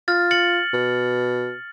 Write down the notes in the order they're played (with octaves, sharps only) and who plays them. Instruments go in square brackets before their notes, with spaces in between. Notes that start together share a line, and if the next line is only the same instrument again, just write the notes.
[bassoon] F4 [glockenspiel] F6 A6
[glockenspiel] A6 C#7 F#7
[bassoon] B2